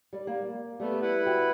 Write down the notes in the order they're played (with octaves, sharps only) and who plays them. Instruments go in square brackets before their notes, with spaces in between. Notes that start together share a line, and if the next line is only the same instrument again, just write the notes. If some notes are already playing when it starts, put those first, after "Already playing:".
[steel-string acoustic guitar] G3 D5
A#3
[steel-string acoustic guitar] G3 [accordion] A3 B3
[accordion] E4 B4 F#5
[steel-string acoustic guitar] F#4 E5 G5